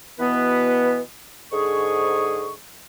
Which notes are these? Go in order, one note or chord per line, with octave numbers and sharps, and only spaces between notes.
B2 E3 B3 B4
G#2 D3 G#4 C#6